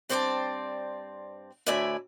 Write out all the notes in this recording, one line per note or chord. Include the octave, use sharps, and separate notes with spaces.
G2 C4 C5 D5 G#5 A5
D2 A2 E4 D5 E5 G#5